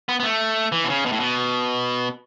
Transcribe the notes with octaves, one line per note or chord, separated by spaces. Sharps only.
B3
B3
A3
E3
B2
C#3
B2
A2
B2